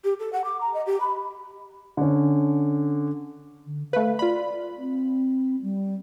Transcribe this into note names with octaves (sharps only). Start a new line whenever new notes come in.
G4
A4
F#5
D6
A#5
D#5
G4
B5
D3 C#4
D3
A3 B4 F5
F4 D5 B5
C4
G3